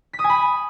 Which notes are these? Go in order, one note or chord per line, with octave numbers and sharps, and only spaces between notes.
B6
D#6
G#5
B5